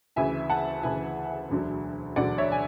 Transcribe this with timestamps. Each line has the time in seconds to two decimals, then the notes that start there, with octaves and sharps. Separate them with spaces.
0.16 D2 C#3 E3 E5 G#5
0.50 F#5 A5
0.83 D2 C#3 E3 E5 G#5
1.50 E1 D2 D3 F#3
2.16 E1 D2 D3 F#3 D5 F#5
2.38 C#5 E5
2.52 G#5